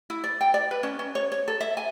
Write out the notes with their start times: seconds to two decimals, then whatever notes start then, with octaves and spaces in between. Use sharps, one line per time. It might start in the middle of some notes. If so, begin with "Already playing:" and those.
0.10 E4
0.24 D5
0.41 G5
0.54 D5
0.71 B4
0.83 C#4
0.99 C#4
1.15 C#5
1.32 C#5
1.48 A4
1.61 E5
1.77 G#5